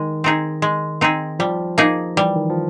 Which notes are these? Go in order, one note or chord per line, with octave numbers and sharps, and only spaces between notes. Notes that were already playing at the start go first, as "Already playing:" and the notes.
Already playing: D#3 G#3
C4 D#4 G#4
G#3
C4 D#4 G#4
F3 G3
A#3 D#4 G#4
E3 G3
D#3
F3